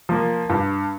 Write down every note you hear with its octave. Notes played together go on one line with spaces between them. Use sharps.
F3 A#3
G2